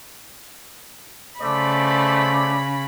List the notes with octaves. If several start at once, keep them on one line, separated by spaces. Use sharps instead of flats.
C#3 A3 C5 D5 B5